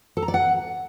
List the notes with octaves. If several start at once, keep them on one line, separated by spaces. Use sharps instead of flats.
A4
A#5
D5
F#5